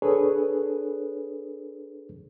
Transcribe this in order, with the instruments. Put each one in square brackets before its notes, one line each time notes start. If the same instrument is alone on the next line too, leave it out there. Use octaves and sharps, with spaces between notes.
[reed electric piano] D4 G#4 A4 B4 C#5